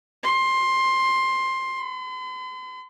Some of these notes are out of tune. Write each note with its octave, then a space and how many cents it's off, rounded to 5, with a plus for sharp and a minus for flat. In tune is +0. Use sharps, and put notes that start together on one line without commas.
C6 +15
C6 -45